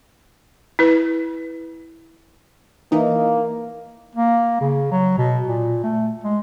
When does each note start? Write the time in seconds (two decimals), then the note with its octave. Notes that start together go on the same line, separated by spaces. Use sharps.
0.79 E4 B4
2.92 E3 A#3 D#4
4.15 A#3
4.61 C#3
4.91 F#3
5.18 B2
5.48 A#2
5.84 A3
6.24 G#3